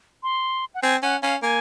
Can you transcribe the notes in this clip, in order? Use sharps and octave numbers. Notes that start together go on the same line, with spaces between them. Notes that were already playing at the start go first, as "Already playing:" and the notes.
C6
F#5
C4 G#5
C#4 F#5
C#4 F5
A#3 G#5